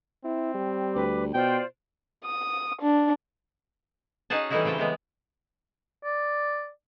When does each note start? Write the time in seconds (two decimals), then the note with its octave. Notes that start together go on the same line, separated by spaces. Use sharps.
0.25 C4 E4
0.54 G3
0.95 D2 B4 D6
1.34 B2 F4 C5 D5 G5
2.25 D#6
2.81 D4
4.30 C#4 D#4 F#4 G#4 F#5 A5
4.50 E3 G3 A3 D#4 E4 F#4
4.64 C#3 G3 C4 G5 A5
4.78 E3 G#3 B3
6.04 D5